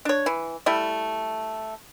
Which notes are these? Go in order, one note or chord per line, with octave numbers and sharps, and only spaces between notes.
D4 C#5
E3
G3 A3 E4